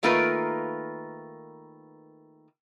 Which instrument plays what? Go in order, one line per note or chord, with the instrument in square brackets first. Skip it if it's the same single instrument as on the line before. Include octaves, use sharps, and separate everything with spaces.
[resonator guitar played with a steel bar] D#3 A3 A#3 F4 A#4 B4